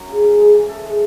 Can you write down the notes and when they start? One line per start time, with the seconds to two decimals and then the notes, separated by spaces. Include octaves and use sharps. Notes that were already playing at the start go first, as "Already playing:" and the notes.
Already playing: F#2 F#3
0.08 C#3
0.24 C#3
0.39 G#3
0.54 E3
0.69 A4
0.85 G#3